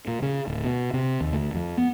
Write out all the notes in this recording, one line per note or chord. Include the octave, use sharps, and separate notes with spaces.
A#2
C#3
D1
B2
C3
D#2
D2
F2
B3